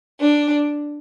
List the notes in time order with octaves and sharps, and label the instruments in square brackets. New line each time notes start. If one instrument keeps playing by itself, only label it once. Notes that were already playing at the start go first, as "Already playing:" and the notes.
[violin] D4